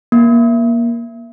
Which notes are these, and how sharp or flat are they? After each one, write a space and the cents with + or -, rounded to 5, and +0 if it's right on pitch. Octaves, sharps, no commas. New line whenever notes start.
A#3 +20